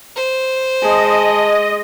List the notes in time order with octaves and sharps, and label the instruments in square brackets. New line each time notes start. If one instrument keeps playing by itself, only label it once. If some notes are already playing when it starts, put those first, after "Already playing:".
[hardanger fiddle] C5
[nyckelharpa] G#3 [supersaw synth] D#5 [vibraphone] G#5 A5